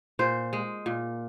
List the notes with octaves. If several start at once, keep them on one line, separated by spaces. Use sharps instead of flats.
A#2 C5
G#3
A#2